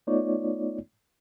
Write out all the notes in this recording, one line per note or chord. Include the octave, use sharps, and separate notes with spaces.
A3 B3 D#4 F4 C#5 D5